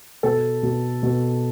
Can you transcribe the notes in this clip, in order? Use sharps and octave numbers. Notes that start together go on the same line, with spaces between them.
B2 A4
B2
B2